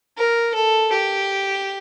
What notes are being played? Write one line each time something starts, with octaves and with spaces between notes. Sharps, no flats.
A#4
A4
G4